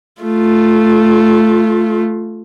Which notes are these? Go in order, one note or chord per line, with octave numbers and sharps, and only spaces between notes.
A3 F4